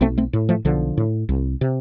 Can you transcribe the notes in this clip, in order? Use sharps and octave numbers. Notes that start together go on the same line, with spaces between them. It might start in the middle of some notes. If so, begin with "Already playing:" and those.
B1 A3 C4
A3 C4
A2
F3 A3
B1 D3 F3
A2
C2
C3